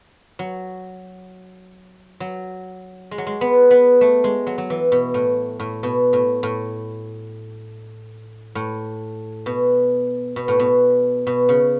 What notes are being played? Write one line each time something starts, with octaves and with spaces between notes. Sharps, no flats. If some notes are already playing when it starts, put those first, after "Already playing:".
F#3
F#3
G#3
F#3
G#3
B3
B3
A3
G#3
F#3
F#3
E3
B2
A2
A2
B2
A2
A2
A2
B2
B2
A2
B2
B2
C#3